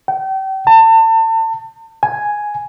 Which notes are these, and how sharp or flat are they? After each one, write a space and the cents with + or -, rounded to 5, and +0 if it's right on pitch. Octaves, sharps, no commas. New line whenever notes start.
G5 -35
A5 +35
G#5 +5